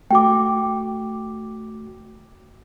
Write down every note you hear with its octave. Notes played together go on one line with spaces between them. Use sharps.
A3 F#4 G5 D6